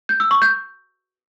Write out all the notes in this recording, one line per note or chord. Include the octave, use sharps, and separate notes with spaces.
G6
E6
C#6
G6